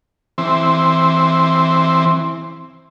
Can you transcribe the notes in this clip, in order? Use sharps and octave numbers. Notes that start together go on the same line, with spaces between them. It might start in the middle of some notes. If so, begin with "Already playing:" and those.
E3 C4